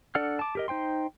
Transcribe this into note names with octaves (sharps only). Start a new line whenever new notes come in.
D4 A4 D5 F#5 F6
A5 D6
G4 A#4 D#5
D#4 C5 G5 C6